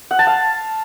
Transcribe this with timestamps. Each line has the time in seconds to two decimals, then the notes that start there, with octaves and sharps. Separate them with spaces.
0.11 F#5
0.19 A5
0.27 F5